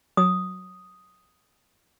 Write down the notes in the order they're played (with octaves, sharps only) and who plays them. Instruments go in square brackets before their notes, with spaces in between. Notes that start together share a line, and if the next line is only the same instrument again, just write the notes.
[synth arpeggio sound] F#3 [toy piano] D#6